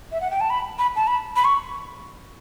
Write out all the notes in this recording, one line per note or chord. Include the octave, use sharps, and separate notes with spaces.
E5
F#5
G5
A5
B5
B5
A5
B5
B5
C#6